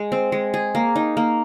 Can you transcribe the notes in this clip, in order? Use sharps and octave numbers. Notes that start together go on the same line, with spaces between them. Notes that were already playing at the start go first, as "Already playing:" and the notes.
Already playing: G#3
C4
G#3
G#4
A#3
D#4
A#3